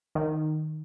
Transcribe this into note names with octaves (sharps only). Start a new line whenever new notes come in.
D#3